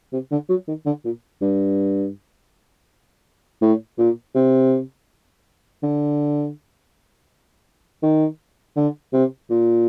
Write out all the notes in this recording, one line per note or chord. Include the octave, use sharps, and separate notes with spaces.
C3
D3
F#3
D#3
D3
A#2
G2
A2
A#2
C3
D3
D#3
D3
C3
A#2